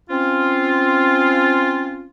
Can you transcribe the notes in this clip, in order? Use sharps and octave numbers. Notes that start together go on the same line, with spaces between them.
C4 C#4 F4